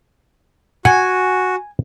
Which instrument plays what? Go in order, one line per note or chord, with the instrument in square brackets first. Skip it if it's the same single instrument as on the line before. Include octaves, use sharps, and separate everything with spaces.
[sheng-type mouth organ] F#4 [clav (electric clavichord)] F#5 [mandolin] G#5